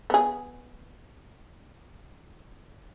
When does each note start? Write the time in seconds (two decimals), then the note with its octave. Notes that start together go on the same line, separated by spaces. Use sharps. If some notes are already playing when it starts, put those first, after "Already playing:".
0.10 B3 G#4